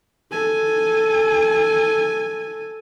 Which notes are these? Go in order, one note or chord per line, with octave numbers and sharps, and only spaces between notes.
A4 G#5